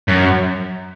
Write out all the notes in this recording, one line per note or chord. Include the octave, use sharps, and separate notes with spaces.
F#2